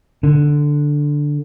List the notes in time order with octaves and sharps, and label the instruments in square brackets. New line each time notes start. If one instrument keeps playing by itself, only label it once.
[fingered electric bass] D3